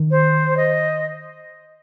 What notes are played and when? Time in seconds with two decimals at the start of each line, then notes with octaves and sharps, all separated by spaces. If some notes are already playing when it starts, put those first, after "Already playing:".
Already playing: D#3
0.11 C5
0.57 D#5